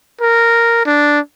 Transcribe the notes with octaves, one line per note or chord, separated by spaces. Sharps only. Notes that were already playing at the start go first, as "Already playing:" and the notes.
A#4
D4